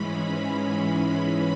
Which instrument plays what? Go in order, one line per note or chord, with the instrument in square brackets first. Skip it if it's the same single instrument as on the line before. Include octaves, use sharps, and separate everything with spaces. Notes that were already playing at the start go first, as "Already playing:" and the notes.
Already playing: [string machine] G#2 E3 G#3 C#4 B5
B5